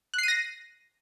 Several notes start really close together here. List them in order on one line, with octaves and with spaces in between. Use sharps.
F#6 C7 D#7 A#6